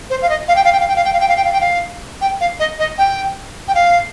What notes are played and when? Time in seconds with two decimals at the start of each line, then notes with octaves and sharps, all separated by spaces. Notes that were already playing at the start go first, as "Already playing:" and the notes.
0.10 C5
0.22 F5
0.29 D#5
0.48 F5
0.56 G5
0.64 F5
0.73 G5
0.80 F5
0.88 G5
0.96 F5
1.05 G5
1.13 F5
1.20 G5
1.28 F5
1.36 G5
1.44 F5
1.52 G5
1.60 F5
2.21 G5
2.40 F5
2.59 D#5
2.79 D#5
2.98 G5
3.68 G5
3.75 F5